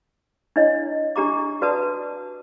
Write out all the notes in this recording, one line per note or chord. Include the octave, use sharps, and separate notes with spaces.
D4 E4 C#5 D#5
D4 G4 A#5 D6
F#4 B4 D5 A5 D#6